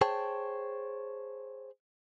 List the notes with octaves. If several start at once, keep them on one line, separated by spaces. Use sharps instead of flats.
G#4 C5 C#5 G5 A5